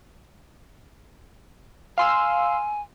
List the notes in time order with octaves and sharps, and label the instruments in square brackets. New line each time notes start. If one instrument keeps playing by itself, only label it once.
[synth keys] F5 C6 E6 [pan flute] G#5